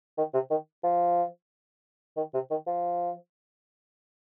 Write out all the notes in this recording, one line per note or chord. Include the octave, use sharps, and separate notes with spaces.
D#3
C3
D#3
F3
D#3
C3
D#3
F3